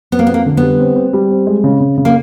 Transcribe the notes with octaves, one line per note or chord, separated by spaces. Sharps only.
B3 C4
A#3
B3
F2 A#3
D3
B3
G3
C4
C4
G3
C4
G#3
C#3
C#3
C#3
A#3